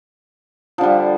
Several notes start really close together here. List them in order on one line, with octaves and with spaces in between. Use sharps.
F3 D3 G3